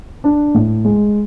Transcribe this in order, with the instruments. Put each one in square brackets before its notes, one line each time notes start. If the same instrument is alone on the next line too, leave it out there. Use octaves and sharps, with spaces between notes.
[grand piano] D4
A2
G#3